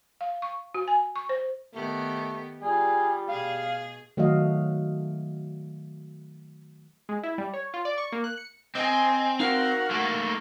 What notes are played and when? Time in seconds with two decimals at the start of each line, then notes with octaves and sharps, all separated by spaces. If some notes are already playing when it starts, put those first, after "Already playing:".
0.21 F5
0.42 C#6
0.74 F#4
0.88 G#5
1.16 C#6
1.29 C5
1.74 D#3 A3 B3 G4
2.62 G3 F4 G#4
3.29 B2 G#4 F5
4.17 D#3 F#3 A3 F#4 D#5 F5
7.09 G#3
7.23 E4
7.38 G3
7.53 C#5
7.74 F4
7.85 D5
7.98 C#6
8.12 A#3
8.24 F#6
8.38 C#7
8.75 C4 D#5 G#5
9.40 D#4 F#4 A#4 F5 F#5
9.91 A3 A#3